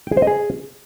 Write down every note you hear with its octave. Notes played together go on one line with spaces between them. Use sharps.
G5
G#4
C5
D#5
G#4